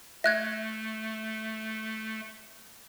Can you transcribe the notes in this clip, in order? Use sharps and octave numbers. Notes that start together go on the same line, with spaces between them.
A3 E5 F#6 G#6